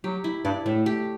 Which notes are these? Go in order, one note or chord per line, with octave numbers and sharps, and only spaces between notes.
F#3 G4
E4
G2 D5
A2 A3
G4